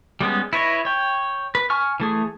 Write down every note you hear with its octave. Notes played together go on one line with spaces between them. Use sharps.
G3 G#3 B3 C#4
E4 B4 C#5 D#5
C#5 G5
B4
G#5 C#6 F6
E3 A3 G#4